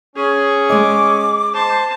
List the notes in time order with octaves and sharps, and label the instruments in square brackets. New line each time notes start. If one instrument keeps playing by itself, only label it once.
[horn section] C#4 [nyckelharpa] G#4
[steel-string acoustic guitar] G#3 D#5 [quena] D6
[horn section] C5 [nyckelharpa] A5